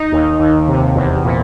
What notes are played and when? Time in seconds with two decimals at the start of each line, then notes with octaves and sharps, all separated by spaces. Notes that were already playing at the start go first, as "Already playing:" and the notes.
Already playing: D#4
0.12 D#2
0.40 D#2
0.68 C3
0.95 E2
1.24 A#2